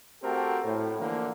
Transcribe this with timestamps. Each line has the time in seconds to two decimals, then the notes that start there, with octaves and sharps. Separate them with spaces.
0.23 A3 C4 F#4 G4 A4 A#4
0.65 A2
0.98 D3 E3 F3 A#3